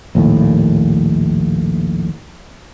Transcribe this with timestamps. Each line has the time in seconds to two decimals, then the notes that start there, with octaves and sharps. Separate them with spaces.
0.15 A#1 D#2 A2